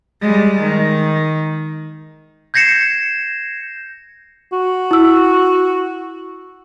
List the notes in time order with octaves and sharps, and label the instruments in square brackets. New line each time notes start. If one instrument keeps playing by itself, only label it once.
[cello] G3 G#3
D#3
[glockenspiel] G6 G#6 A#6 C7 C#7 E7
[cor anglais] F#4
[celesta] E4 E6